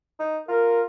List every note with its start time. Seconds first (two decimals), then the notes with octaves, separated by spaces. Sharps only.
0.20 D#4
0.48 F4 A#4